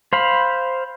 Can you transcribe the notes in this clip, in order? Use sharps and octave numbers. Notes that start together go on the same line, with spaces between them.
C5 F5 B5